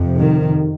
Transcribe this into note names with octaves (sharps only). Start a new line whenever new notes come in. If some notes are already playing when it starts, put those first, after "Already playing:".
Already playing: F2 C3
D#3